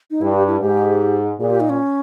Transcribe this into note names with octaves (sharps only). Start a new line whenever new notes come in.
D#4
G2 E4
G4
E4
G#2 G4
A#2 G#4
G4
D#4
C#4